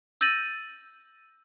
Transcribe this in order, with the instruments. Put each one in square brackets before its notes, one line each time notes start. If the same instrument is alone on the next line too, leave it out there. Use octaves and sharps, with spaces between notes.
[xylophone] E6 G6 A6 A#6 D#7 F#7